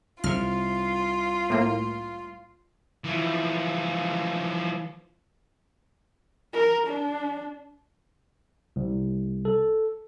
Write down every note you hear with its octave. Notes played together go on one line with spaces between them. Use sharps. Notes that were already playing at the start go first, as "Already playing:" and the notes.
C2 C3 F4 F6
A2 A#3
E3 F3
A#4
D4
C2
A4